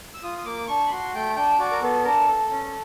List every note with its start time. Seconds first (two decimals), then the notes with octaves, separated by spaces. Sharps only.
0.14 E6
0.23 F4 D#6
0.38 D#6
0.45 A#3 D6
0.68 D4 C#6
0.86 B5
0.91 F#4 C6
1.14 A3 G5
1.36 D4 G5
1.59 F#4 D5
1.71 A#4
1.82 B3 A4
2.04 D4 A#4
2.28 A4
2.50 C#4